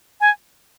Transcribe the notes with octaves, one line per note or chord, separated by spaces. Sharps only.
G#5